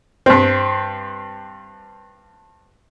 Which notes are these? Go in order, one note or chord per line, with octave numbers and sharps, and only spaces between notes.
G2 C4